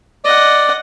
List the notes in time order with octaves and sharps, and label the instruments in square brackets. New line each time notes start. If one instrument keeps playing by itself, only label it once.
[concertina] D5 [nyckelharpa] D#5 F#5